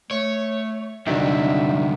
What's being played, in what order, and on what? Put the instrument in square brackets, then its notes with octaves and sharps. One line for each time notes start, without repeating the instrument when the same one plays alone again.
[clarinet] A3 [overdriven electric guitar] C#5
[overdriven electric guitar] C2 D3 [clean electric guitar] D#3 F#3 D4 [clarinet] E5